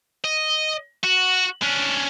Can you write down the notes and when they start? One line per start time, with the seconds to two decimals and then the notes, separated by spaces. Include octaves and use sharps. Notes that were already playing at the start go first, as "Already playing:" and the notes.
0.24 D#5
1.04 F#4
1.63 C#4 D4